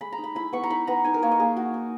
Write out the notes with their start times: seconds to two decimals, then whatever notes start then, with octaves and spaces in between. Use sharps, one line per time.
0.01 G#3 B5
0.12 A#5
0.18 D#4
0.24 B5
0.35 E4 B5
0.52 B3 C#6
0.63 A#5
0.70 D#4 B5
0.87 B3 A#5
1.04 D#4 G#5
1.14 A#4
1.22 A#3 C#5
1.31 D#5
1.39 A#3 G#4
1.57 D#4 F#4
1.74 D#4